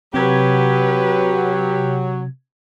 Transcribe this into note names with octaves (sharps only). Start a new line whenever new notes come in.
C3 F#3 G4 B4 G#6